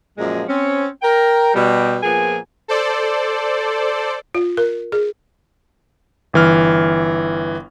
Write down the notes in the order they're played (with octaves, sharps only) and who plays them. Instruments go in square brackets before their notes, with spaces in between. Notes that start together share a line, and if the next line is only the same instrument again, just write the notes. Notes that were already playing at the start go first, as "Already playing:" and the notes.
[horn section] F#2 A#2 F3 G#3
C4 C#4
A#4 G5
B2 G3
A#2 F3 B3 G#4 A#4 G#5
[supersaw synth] A4 C5 D5
[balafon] F4
A#4
G#4
[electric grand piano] G1 E3 F6